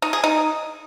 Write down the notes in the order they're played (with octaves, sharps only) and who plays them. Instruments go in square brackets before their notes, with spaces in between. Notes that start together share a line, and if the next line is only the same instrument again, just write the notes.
[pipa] D#4
G#4
D#4